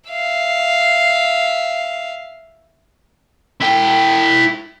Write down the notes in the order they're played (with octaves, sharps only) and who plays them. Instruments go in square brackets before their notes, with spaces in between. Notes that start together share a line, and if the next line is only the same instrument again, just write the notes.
[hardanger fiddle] E5 F5
[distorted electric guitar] E4 G5